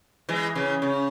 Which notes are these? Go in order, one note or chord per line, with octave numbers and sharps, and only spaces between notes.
E3 G#3
C#3 E3
C#3